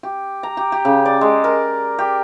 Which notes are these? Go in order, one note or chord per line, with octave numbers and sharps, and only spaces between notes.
G4
A#5
G4
G4
C#3
D5
G#3
A#4
G4